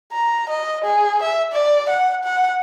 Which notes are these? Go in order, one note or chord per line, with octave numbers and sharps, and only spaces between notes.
A#5
D#5
G#4
E5
D5
F#5
F#5